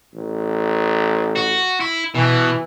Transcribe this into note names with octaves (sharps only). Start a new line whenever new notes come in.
A1
F#4
E4
B2 E3